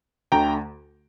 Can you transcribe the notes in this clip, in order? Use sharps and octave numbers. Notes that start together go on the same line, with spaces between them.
D2 D3 A3 G5 A#5